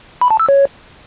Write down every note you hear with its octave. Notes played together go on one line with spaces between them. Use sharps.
B5
A5
E6
C#5